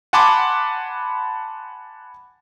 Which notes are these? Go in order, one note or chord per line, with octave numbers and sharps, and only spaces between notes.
F#5 G#5 A5 B5 C6 D6